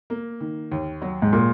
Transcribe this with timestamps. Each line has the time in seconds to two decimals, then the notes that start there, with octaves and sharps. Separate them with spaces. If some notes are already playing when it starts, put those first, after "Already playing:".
0.10 A#3
0.41 D#3
0.72 D#2
1.02 F#3
1.22 G#2
1.33 A#2 G#3